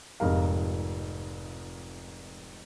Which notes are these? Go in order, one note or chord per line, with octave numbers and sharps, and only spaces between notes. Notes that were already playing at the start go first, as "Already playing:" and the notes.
F1 F2 G#2 A#4 F5